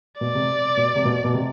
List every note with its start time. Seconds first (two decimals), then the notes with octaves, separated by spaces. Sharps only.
0.21 B2 D5
0.35 C3
0.77 B2
0.96 C3
1.05 B2
1.24 B2
1.34 C3